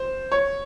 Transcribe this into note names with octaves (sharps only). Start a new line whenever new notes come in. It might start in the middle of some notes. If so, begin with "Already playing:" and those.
Already playing: C5
C#5